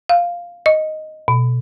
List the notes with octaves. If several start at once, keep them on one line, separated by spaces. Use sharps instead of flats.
F5
D#5
B2